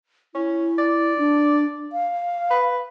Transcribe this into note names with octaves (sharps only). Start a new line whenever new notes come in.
C#4 E4
D5
D4
F5
B4